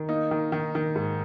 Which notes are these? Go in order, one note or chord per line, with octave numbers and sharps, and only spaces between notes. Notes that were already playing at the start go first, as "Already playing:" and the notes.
Already playing: D#3
A#3 D#4
D#3
D#3
D#3
G#2